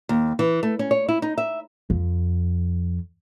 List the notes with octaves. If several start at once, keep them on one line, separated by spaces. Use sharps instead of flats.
D#2
E3
A3
C#4
C#5
E4
D#4
E5
F2